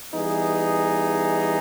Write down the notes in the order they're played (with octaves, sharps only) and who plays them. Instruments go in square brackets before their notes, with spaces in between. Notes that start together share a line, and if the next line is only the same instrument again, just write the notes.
[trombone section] E3 G3 B3 D#4 G#4